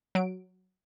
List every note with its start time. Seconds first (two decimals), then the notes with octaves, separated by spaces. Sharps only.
0.15 F#3 D7